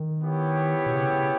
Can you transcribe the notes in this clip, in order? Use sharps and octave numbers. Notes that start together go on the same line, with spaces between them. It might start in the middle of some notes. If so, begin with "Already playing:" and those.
Already playing: D#3
B3 E4 G4 C#5
B2
C#3
C#3